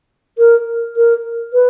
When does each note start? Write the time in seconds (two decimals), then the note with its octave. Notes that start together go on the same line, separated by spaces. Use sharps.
0.38 A#4
0.97 A#4
1.53 B4